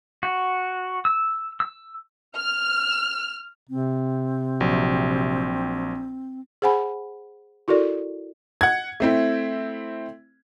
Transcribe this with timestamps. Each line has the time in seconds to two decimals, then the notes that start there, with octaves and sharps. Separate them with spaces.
0.23 F#4
1.05 E6
1.60 E6
2.37 F6
3.69 C3 C4
4.61 A#1 F#3
6.62 G#4 C5 F#5 G#5 B5
7.68 E4 F#4 A4 A#4 D5
8.61 F#5 G#6
9.00 A3 C4 E4